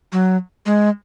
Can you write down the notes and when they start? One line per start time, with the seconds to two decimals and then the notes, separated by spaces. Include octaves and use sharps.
0.12 F#3
0.66 G#3